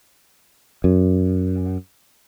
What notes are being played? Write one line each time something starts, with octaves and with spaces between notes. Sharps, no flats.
F#2